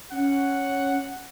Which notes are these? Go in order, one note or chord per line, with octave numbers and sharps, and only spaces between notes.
C#4 F#5